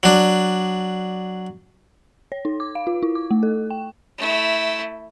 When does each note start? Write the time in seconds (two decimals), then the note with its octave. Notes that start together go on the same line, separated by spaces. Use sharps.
0.03 F#3 D4
2.32 C#5
2.45 D#4
2.60 D6
2.75 F5
2.87 F4
3.03 E4
3.15 D6
3.31 A3
3.43 A4
3.70 G5
4.18 A3 E4